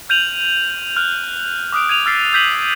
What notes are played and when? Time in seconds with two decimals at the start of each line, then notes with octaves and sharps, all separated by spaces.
0.09 F6 G6 D#7 F7 F#7
0.96 F6 F#6
1.72 D6 D#6 F#6 D7
1.89 G#6 D#7 F7
2.06 E6 F6 A6 B6 C7 D7
2.33 E6 F#6 G6 B6 D#7 F#7